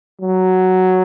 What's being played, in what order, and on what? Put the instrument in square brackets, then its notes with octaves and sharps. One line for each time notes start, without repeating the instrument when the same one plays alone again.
[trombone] F#3